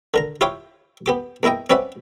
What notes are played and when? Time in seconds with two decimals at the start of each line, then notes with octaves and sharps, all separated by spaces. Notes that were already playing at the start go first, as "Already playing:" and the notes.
0.14 D3 A#4 A#5
0.41 E4 F4 G4 C#5 F5 D6
1.06 B3 G4 D6
1.43 E2 A#3 E4 D#5 G5
1.70 C4 C#4 B4 D5 E5 F#5